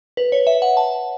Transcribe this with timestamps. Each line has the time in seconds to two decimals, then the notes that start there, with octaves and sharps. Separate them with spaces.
0.17 B4
0.32 C#5
0.47 E5
0.62 F#5
0.77 A5